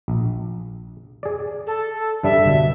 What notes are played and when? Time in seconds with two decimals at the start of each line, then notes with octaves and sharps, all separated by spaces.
0.08 A#1
1.23 G#4 D5
1.66 A4
2.23 G2 G3 D4 E5
2.46 G1 B2